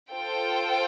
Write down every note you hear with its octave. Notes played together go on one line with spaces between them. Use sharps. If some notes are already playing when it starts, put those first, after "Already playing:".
F4 A4 C5 G5